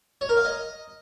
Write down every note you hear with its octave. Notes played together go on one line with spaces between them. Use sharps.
C#5
A#4
F5
D#5